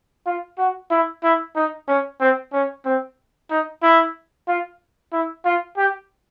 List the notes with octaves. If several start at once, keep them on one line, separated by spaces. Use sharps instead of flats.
F4
F#4
E4
E4
D#4
C#4
C4
C#4
C4
D#4
E4
F4
E4
F4
G4